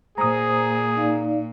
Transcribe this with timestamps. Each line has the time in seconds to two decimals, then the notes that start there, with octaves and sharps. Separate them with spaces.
0.18 A#2 G#4 C5 A#5 D#6
0.96 D#4 D5 F5